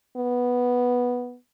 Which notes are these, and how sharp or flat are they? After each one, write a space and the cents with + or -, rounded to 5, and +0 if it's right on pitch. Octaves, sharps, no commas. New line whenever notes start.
B3 -5